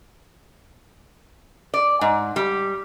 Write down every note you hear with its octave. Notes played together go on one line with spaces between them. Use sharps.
D5
G#2
G3